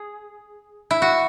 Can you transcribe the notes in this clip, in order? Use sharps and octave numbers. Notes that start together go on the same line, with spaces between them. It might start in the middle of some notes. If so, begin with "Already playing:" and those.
Already playing: G#4
E4
F#4